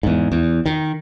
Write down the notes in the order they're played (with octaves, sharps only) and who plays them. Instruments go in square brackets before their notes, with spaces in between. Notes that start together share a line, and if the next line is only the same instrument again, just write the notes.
[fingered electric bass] E2 G#2
E2
D#3